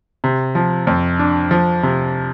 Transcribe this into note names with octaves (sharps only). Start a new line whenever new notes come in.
C3
F3
F2
D4
F3
C3